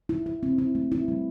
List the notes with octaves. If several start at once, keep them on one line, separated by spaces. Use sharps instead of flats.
E4
E4
C4
E4
A3
E4
G3